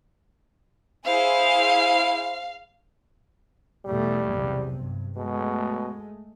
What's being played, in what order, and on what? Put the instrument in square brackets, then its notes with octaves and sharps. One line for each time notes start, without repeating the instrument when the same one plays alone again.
[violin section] E4 G#4 C5 [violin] F5
[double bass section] E2 B2 A3 [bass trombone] G3
[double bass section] B1 E2 C3
G2
[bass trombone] B2 [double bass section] G#3 A3